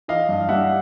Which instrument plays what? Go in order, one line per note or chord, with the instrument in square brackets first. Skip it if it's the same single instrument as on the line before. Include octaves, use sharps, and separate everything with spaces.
[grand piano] E3 D#5 F5
G2
G3 E5 F#5